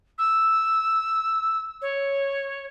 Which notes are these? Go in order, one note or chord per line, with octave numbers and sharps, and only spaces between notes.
E6
C#5